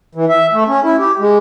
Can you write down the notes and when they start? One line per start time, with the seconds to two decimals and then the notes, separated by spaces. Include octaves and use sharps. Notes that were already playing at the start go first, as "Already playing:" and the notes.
0.15 E3
0.29 E5
0.53 A3
0.68 C#4
0.84 E4
0.99 G4
1.19 G#3